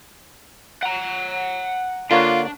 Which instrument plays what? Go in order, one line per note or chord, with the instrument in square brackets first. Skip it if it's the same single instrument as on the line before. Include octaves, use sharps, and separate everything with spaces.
[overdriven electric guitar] F#5 A#5
[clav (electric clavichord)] D3 A#3 C#5 [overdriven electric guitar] D4 [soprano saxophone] F4